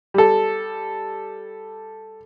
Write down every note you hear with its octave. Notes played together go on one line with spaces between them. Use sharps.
G3 A4